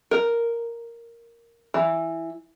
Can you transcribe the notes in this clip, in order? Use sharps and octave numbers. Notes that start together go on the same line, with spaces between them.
A#4
E3